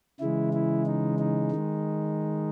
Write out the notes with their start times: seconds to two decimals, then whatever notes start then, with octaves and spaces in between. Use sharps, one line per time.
0.20 C#3 E3 G#3 E4
0.53 E4
0.86 D#4
1.19 D#4
1.51 D#3 G#3